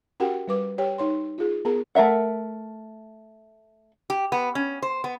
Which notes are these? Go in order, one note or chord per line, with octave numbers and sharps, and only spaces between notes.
C#4 F#4 G4 A#4 F#5 G5
G3 B4 D6
G4 C#5 G5
D#4 C#5 C6
F4 G#4
B3 G#4 A#4 A#5
A3 A#4 E5 F#5
G4
B3
C#4
C5
B3